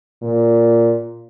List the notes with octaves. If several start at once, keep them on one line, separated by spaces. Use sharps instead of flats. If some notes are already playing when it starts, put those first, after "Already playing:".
A#2